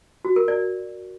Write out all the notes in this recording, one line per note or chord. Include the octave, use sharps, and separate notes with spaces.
F#4
A#4
D5